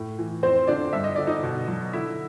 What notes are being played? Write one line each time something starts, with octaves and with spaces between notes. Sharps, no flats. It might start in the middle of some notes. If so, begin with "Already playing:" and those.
Already playing: A2
E3
F2 C4 C5
D3 D4 D5
G2 E5
D#5
D3 D5
D#4 D#5
B2
F#3
D3 E4 E5